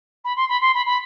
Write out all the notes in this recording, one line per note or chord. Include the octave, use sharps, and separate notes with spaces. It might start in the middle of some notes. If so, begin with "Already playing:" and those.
B5
C6
B5
C6
B5
B5